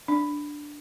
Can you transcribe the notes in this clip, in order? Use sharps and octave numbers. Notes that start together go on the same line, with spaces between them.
D4